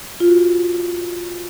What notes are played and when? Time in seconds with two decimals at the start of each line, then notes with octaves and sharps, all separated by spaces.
0.20 F4
0.28 F#4
0.38 F4